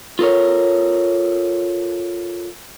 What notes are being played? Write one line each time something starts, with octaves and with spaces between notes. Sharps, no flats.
F4 A4 A#4 C#5